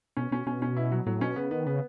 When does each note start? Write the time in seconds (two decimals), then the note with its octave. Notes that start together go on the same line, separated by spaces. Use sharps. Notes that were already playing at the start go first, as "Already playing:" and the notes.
0.17 B2 C#4
0.31 B2 C#4
0.46 B2 C#4
0.62 C#4
0.77 E4
0.92 F#3
1.06 A2 F#3
1.21 B2 C#4
1.36 C#3 B3
1.51 D#3 B3
1.67 C#3 B3